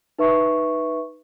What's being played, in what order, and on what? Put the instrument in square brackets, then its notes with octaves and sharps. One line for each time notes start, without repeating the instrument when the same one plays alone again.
[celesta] D#4 B4 E5 C#6